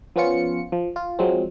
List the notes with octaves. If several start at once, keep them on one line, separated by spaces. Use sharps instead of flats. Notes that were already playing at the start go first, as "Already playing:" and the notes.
F3 B3 C#4 F4 C#7
F3
F4
F3 F#3 G#3 C4